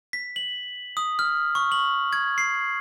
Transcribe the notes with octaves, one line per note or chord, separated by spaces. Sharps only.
B6
F#7
D#6
F6
C#6
F#7
G#6
C7